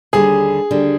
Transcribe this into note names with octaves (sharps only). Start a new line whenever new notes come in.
D#2 D3 G3 G#4
D#2 D3 G3